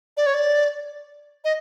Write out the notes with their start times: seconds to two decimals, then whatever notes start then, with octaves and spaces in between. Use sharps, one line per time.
0.17 D5
0.26 C#5
0.34 D5
1.44 D#5